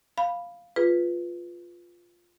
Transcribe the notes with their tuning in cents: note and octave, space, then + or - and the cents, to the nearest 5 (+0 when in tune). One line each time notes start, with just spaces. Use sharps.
F5 +0 B5 +0
F4 +0 G#4 +0 B4 +0